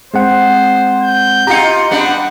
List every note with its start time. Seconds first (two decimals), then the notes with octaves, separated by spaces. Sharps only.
0.14 G#3 C4 C5 F#5
1.02 G6
1.47 D#4 F4 G4 A#5 C#7
1.91 G3 B3 D4 F#5